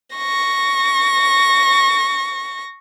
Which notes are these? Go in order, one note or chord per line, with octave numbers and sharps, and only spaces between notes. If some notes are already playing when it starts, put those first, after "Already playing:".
C#6 A#6